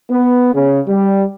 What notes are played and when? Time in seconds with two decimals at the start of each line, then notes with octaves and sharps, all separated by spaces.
0.10 B3
0.54 C#3
0.86 G3